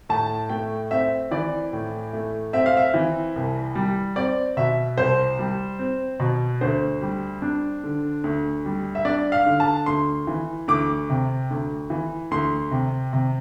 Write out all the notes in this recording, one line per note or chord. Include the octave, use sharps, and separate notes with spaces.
A2 A5
A3 G5
C4 E5
E3 D5
A2
A3
C4 E5
F5
E5
E3
C2
G3
C4 D5
B2 E5
C2 C5
G3
C4
B2
D2 C5
G3
D4
D3
D2
G3
E5
D4 D5
F5
D3
A5
D2 C6
E3
D2 D6
C3
D2
E3
D2 C6
C3
C3